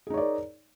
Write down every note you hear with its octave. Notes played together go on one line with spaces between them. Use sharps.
D#4 G#4 A#4 C#5 D5